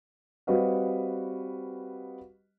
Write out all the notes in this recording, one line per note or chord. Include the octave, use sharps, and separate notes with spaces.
G3 C4 F#4 B4 D#5 F5